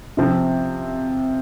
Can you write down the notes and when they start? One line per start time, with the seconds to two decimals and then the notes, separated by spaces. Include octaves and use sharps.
0.17 C3 F3 C4